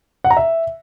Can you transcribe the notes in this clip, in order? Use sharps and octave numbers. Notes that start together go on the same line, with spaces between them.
F#5
A#5
E5